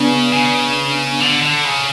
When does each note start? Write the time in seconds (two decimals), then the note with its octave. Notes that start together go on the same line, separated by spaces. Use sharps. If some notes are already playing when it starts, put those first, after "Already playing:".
Already playing: C#3 B3 D4
0.33 C#3
1.20 D3
1.42 D3
1.64 C#3